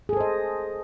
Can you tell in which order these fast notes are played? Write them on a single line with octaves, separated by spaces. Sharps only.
G#4 A4 C5 D#5